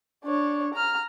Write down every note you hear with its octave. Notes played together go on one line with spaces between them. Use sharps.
D4 C#5
A#5 F6